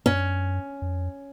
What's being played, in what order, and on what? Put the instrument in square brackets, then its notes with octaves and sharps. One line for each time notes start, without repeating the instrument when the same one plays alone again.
[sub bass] F#2 [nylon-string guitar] C#4
[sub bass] F2